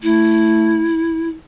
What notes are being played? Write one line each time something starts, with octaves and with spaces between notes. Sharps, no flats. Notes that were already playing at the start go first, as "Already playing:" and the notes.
A3 E4